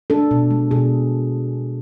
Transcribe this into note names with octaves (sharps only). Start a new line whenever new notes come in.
D4 A4
B2
G#3
B2 G#4